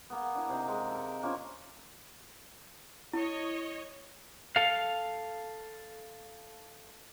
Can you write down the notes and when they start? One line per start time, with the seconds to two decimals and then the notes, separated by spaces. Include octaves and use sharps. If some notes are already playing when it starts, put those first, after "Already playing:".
0.10 A#3 B3
0.35 D4 E4
0.49 C3 D#4
0.66 G#3 A#4 D#5
0.90 A4 A#4
1.23 F3 A#3 C#4 D4
3.13 E4 C#5 D#5
4.56 A4 F5